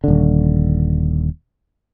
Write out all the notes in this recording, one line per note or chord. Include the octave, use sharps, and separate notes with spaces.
D#1 D3